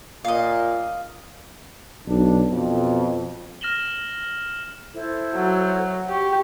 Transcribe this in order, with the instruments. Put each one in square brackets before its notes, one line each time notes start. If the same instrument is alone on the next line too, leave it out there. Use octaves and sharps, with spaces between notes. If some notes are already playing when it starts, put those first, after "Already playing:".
[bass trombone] A#2 [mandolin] D#5 F5
[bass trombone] B1 [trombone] D4
[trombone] F2 [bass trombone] B2
[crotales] F6 A#6 E7 F#7 G7
[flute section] E4 A4 C5
[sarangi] F#3
[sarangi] G4 [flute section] C#6